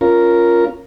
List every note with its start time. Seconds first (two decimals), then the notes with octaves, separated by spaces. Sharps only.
0.01 C#4 F4 A#4